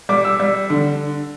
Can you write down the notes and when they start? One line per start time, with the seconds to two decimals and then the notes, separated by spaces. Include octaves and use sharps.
0.09 G3 D6
0.25 E6
0.40 G3
0.70 D3